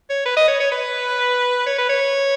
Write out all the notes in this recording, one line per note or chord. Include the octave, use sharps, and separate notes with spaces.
C#5
B4
D#5
C#5
C#5
B4
C#5
B4
C#5